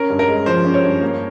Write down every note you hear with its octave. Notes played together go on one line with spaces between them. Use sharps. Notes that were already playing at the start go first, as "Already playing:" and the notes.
Already playing: C#4 A#4
G2
A#4
G#3
F3 C5
C#4
C#5
G2
A#3